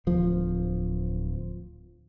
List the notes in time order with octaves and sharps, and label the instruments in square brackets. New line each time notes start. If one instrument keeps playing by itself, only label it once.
[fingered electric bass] D1 F3